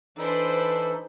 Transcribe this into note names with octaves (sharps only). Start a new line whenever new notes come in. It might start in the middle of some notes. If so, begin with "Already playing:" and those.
E3 D4 D#4 A4 B4 C5